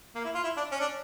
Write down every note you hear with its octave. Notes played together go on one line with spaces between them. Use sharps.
A#3
E4
F4
E4
D4
C#4
D4